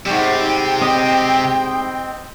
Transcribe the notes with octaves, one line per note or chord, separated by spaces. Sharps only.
G#2 C3 G3 G5
C4 D#5